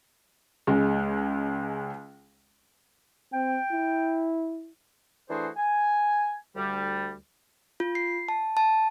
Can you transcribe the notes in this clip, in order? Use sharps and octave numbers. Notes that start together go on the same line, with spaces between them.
C#2 G#3
C4 G5
E4
E3 A3 D4 F#4 G#4 C5
G#5
D2 G3
F4
C7
A5
A5